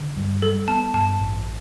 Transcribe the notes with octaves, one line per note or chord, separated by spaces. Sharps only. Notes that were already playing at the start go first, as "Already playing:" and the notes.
Already playing: D3
G2
G3 A4
B3 A5
G2 A5
A1